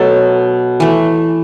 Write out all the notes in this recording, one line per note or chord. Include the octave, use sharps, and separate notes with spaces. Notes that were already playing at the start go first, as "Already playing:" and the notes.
Already playing: B2 F#3 A3 A4
E3 A3